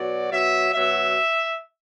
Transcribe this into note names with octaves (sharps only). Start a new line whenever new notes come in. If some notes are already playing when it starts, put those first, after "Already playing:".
Already playing: B2 F#3 D5
B2 F#3 E5
B2 F#3 E5